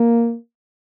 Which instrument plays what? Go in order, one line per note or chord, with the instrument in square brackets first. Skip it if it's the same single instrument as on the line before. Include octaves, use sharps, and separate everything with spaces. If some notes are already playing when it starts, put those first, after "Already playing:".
Already playing: [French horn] A#3